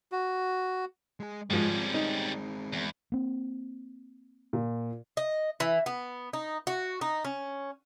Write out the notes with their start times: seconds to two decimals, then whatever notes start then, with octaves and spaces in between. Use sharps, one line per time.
0.12 F#4
1.20 G#3 G#4
1.50 G#2 F3 G3 G#3 C#4
1.70 G#3 C4
1.94 D#4
2.73 E2
3.12 A#3 C4
4.53 A#2
5.17 D#5
5.60 E3
5.86 B3
6.33 D#4
6.67 F#4
7.01 D#4
7.25 C#4